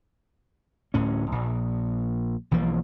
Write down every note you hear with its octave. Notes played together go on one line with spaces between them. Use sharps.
D1 A2 C#4
A#1
B1 E3 F3 A#3